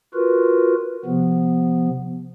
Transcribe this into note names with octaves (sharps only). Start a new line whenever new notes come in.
F4 F#4 A#4 B4
C3 F3 B3